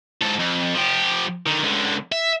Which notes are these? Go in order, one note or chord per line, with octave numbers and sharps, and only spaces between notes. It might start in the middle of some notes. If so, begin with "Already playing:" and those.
G#2 A4
F2
F3 G4
D3 D#3
C#2 D3
E5